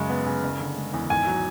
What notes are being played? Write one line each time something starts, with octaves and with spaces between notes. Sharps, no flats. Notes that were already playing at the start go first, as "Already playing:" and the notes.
Already playing: F#2 C#3 G#3
B3
C#3
F#1
D3
G#3
E2
G#1 G#5
F#3